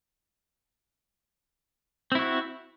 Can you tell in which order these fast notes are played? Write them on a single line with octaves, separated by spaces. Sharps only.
C4 E4 F#4